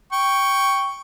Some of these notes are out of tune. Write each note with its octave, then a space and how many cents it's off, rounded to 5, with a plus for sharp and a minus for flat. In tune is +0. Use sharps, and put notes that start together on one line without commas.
G5 +0 C#6 +0